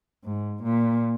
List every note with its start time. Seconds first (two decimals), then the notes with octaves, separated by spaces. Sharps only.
0.24 G#2
0.64 A#2